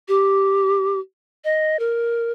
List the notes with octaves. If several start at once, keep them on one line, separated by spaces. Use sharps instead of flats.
G4
D#5
A#4